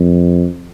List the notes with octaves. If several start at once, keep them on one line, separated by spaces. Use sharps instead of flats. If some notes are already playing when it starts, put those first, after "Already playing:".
Already playing: F2